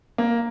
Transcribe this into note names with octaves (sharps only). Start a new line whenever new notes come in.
A#3